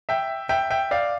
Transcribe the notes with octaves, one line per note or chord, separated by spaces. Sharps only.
E5 G5
E5 G5
E5 G5
D5 F5